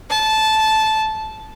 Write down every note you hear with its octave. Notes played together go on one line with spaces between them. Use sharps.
A5